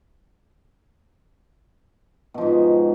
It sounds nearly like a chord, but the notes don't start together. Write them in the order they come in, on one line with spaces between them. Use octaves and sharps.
B2 F3 G#2